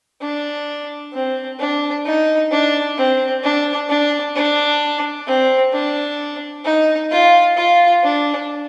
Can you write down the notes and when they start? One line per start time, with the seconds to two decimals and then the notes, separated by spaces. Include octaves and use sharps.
0.21 D4
1.13 C4
1.59 D4
2.05 D#4
2.51 D4
2.97 C4
3.43 D4
3.89 D4
4.35 D4
5.27 C4
5.73 D4
6.65 D#4
7.11 F4
7.57 F4
8.03 D4